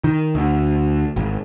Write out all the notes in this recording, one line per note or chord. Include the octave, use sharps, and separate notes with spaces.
D#3
D2
G#1